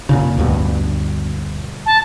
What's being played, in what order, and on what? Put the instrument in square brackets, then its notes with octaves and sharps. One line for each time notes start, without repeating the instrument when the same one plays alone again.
[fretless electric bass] F#2 A#2 C#3
D2 G2 B2
[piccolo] A5